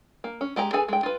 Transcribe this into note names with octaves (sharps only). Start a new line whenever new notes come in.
A#3
C#4
G#3 G4 G5 A#5
G#4 A4 B4 G#5
G#3 G5
F4 B4